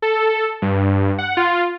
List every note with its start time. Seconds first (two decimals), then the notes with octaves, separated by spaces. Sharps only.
0.02 A4
0.62 G2
1.18 F#5
1.37 F4